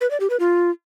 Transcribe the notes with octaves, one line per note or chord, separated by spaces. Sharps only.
B4
D5
G4
B4
F4